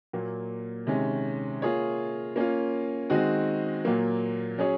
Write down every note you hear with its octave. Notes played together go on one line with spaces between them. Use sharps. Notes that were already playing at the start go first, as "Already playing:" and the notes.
A#2 F#3 A#3
C3 D#3 G#3 C#4
A#3 F4 G#4 C#5
A#3 C#4 F4
D#3 G#3 C4 D#4 F#4
A#2 F#3 A#3
F#3 C#4 G#4 C#5